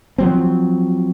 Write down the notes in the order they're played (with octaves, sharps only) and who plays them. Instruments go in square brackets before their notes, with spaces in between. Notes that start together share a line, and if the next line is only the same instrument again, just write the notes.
[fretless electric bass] F3 F#3 C4